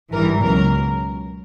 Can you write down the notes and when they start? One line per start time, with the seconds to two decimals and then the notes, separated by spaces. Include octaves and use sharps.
0.13 G#1 G2 E3 A#4
0.41 C#2 B2 F#3 A#4